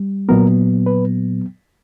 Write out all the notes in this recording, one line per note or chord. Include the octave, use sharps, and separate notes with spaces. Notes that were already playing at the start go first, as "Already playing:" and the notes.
Already playing: G3
A#2 F#3 B3 A#4
B4